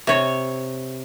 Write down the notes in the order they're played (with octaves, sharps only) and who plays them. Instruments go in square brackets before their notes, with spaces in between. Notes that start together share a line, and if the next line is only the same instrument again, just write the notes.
[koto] C3 C#5